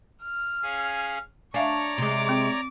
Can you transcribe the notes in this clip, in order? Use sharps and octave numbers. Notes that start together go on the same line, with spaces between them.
F6
C#4 G#4 F5
D4 C#5 D5 E5 F5 G#5 A#5 C#6
C3 G#3 D6
C4